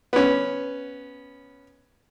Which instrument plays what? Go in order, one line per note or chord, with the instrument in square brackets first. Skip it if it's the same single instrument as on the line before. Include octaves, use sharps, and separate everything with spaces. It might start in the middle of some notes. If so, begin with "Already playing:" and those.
[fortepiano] B3 C#4